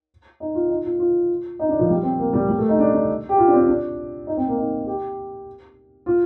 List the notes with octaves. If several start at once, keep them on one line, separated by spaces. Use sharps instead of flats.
D#4
F4
D#4
F4
F4
D#4
D4
F3
G3
C4
A#3
G3
G3
A3
D#4
D4
D4
G4
F4
D4
C4
D4
D4
D#4
C4
A#3
D#4
G4
F4